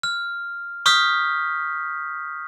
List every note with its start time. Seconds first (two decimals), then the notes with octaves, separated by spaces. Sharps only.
0.03 F6
0.86 C#6 D#6 F6 G6 B6